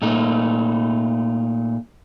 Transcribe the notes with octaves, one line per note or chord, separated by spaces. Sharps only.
A#2 A3 D#4